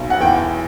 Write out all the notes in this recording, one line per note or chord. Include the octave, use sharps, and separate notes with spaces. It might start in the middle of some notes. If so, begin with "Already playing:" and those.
Already playing: B1
F#5
E2 G5